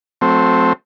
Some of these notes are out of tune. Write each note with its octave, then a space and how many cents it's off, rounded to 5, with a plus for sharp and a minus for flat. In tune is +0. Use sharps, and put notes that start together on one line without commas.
F#3 -35 A3 +0 C4 +0